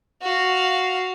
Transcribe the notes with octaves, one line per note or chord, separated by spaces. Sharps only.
F#4 F5